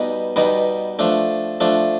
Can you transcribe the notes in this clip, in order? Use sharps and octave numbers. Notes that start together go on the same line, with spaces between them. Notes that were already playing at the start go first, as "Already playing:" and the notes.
Already playing: B2 G3 B3 D#4
B2 G3 B3 D#4
F3 A3 D4
F3 A3 D4